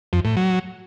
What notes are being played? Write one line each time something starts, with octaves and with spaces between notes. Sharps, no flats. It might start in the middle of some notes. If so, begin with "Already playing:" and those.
F2
A2
F#3